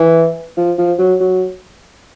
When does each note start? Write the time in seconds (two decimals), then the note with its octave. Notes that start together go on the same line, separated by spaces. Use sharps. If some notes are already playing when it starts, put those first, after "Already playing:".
Already playing: E3
0.57 F3
0.78 F3
0.99 F#3
1.20 F#3